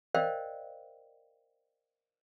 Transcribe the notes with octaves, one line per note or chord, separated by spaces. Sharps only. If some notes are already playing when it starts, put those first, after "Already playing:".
A#4 C5 D5 D#5 F5 G5